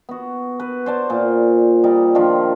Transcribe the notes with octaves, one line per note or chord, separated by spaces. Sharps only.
B3 F#4
B4
C5 D5 A5
A#2
G3 D#4 D5
D#3 F3 D4 F4